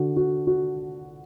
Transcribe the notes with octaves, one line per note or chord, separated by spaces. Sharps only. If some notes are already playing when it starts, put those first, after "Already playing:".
Already playing: D3 F#4
F#4
F#4